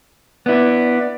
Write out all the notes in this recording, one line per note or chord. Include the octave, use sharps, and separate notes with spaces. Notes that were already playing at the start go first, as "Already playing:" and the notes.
B3 D4 E4 B4 D5